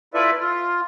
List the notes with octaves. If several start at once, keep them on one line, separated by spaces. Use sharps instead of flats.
E4 F4 A4 B4 D5 E5
F4